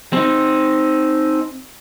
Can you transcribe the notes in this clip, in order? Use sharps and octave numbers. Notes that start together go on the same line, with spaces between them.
C4 D#4